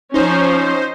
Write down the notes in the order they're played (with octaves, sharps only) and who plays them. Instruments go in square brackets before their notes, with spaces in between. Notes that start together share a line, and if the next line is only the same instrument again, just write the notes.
[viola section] F3 C#4 [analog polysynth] D#4 C5